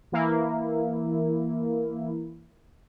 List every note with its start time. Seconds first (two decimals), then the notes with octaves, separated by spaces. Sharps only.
0.12 E3 A#3 E4